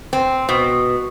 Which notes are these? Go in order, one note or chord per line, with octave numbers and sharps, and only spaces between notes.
C4
B2